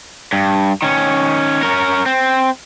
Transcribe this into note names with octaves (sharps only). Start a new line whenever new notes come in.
G2
D#3 C#4
C#4 A#4
C4